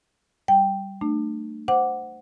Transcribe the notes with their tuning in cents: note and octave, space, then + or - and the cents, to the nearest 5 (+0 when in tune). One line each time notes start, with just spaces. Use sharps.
G3 -10 G5 +0
A3 +25 D4 +40
C5 -5 F#5 +0 D6 +0